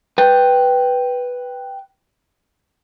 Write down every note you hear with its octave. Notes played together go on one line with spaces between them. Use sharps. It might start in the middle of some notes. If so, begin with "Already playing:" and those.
B4 G5